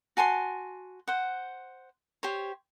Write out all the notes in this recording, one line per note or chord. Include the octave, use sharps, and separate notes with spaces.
F#4 G#5 A5 C6
C5 F#5
G4 C5 C#5